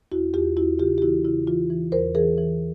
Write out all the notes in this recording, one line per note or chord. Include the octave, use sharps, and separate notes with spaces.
E2 E4 F#4
E2 F4 G4
E2 E4 F#4
C#3 F4 G4
G4
E3 E4 F#4
C#3 E4
E3 F4
E3
E2 A#4 C5
E3 G#4 A#4
E3